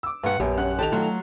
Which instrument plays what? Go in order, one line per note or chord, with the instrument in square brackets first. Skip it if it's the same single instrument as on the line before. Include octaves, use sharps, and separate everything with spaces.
[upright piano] D6 E6
[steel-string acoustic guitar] G2 F#5
[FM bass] A#1 [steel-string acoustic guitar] F#2 [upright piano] B3 [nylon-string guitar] G4
[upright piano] C#4 F#5 F#6
[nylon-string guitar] D#3 A4 A5 [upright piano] G4 F7
[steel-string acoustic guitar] F#3 [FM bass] A3 [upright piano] F4